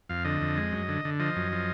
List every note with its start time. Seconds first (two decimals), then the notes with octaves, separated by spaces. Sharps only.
0.09 F2 F5
0.25 D3 D#5
0.41 F2
0.57 G#3
0.72 F#2
0.89 D3
1.05 D3
1.20 F3 D#5
1.36 F#2
1.52 F3